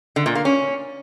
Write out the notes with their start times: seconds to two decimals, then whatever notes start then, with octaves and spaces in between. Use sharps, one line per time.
0.16 D3
0.26 A#2
0.35 A#3
0.45 C#4